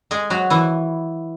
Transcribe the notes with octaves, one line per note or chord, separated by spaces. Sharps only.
G#3 G#4
F#3 F#4
E3 E4